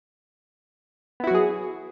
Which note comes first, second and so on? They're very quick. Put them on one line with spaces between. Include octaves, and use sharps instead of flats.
B3 E4 F#4 F#3 G#4